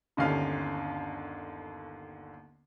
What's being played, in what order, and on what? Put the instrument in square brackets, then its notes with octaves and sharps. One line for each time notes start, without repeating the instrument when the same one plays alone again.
[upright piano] G1 D#2 D3 C#4 F5